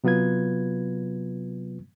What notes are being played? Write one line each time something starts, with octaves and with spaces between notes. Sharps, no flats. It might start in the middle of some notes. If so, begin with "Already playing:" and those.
C3 F#3 B3 F4 B4 G#6